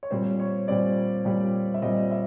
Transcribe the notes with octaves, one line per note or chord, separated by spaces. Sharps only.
C#5
A#2 G3 C4 C5
C#5
A#2 G3 C4 D5
A#2 G3 C4
E5
A#2 G3 C4 D#5
E5